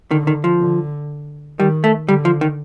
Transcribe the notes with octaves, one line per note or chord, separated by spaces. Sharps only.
D3 D#3
D#3
F3
D3
D#3 G3
A3
D3 G3
F3
D#3